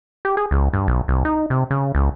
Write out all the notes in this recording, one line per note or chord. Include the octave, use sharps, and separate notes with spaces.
G4
G#4
C#2
G2
B1
C2
D#4
C3
C#3
C#2